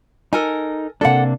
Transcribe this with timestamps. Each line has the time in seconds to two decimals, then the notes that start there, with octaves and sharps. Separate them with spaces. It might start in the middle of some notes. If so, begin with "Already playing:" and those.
0.33 D#4 A4 A#4 G#5
1.01 C3 A#3 D4 A4 F#5